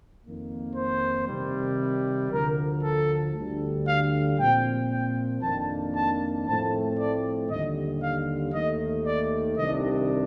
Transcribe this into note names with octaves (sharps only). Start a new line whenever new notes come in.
F2 D#3 A#3
C5
C3 D#3 G3
D2 D3 F3 A#4
A4
D2 D3 G3
F5
A#2 F3 C4 G5
G5
F2 D#3 A#3 D4 A5
A5
A2 F3 A3 C4 A5
D5
D#2 D3 G3 D#5
F5
D#2 D#3 A3 D#5
D5
C2 C3 D#3 G3 D4 D#5